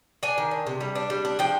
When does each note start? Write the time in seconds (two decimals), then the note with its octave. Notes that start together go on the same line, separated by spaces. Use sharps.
0.23 D4 G#5
0.38 D#3
0.51 D4
0.66 C3
0.81 G3
0.95 D4
1.10 G3
1.25 D4
1.39 F3 G5